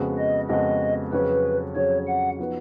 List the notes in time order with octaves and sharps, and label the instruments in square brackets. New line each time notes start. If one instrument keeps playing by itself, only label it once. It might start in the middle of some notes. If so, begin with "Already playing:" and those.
Already playing: [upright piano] F2 C#3 G#3 B3 F#4
[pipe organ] D#5
[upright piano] F2 C#3 G#3 B3 F#4 [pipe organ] D#5
[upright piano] F2 C#3 F#3 C#4 G#4 [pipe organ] B4
[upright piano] F2 C#3 F#3 C#4 G#4 [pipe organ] C#5
[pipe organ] F#5
[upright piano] F3 B3 D#4 F#4 B4